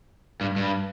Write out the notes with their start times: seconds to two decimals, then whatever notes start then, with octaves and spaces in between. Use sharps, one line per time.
0.41 G2
0.56 G2